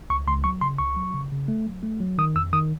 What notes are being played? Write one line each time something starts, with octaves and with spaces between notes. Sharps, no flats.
C#2 C#6
C#2 C6
F#3 C#6
C#3 C6
C#2 C#6
F#3
C#3
C#3
A3
F#3
A3
F#3
D#3 D#6
F2 E6
D#3 D#6